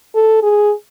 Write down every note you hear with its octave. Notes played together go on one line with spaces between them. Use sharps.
A4
G#4